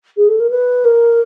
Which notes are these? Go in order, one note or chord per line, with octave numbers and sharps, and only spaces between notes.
G#4
A4
A#4
B4
A#4